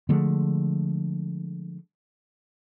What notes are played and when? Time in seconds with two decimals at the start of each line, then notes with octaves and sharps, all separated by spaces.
0.09 D3 F3 G#3 A3